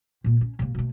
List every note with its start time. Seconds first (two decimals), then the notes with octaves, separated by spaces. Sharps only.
0.24 A#2 A#3
0.41 C#4
0.59 C3 A#3
0.75 B2 A3